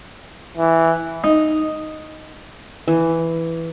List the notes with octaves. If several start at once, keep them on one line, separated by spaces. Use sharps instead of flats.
E3
D#4
E3